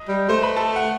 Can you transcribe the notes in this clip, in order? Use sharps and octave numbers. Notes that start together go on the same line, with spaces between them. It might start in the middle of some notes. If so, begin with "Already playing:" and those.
Already playing: D#5 D#6
G3
A3 C5 C6
B4 B5
A4 A5
F#5